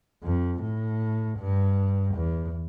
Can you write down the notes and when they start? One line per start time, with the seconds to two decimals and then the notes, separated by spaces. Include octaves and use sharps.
0.23 F2
0.62 A2
1.38 G2
2.15 E2